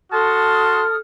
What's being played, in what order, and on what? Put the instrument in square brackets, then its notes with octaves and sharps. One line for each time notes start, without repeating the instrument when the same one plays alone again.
[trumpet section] F#4 A5 C6 [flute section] A4 D#6 F6